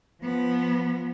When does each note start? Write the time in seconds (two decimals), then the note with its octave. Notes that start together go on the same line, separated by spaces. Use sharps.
0.23 F3 B3